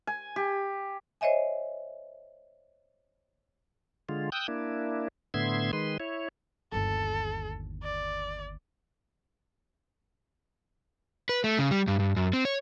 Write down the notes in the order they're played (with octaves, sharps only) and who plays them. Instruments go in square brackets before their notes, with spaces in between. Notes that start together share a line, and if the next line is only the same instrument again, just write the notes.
[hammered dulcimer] G#5
G4
[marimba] C5 C#5 D#5 E5 G#5
[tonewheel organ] D3 G#3 F4
G5 D#6 E6 F#6 G6
A#3 D4 E4
A2 D3 B3 E5 C6 G#6
D#3 G#3 B4 C6
E4 C#5
[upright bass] G1 D#2 [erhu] A4
[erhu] D5
[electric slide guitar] B4
A3
C#3
G3
G2
G2
F#2
C4
C#5